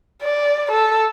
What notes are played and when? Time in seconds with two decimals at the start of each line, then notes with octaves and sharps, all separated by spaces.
0.22 D5
0.72 A4